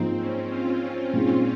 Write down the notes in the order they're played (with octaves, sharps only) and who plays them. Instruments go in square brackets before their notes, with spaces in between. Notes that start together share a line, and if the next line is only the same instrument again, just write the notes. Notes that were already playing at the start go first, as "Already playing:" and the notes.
Already playing: [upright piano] G#2 F3 A#3 D#4 [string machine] C4
[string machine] C#4
F4
[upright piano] A#2 G#3 D#4